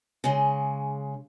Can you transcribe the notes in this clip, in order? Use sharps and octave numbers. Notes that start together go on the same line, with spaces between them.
C#3 G#3